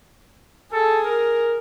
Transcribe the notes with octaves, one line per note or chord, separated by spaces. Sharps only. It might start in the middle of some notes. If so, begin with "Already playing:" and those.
G#4 A4
A#4